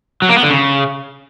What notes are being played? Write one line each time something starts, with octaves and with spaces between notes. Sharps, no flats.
F#3
A#3
B3
D3
C#3